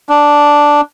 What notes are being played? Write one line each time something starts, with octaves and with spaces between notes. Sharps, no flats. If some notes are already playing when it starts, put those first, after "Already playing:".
D4